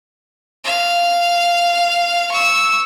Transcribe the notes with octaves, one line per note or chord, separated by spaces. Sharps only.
F5
C#6 E6